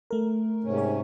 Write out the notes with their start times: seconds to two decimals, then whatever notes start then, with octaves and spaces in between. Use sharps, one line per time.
0.11 A3 A#4
0.64 G#2 C3 C#4
0.78 C#5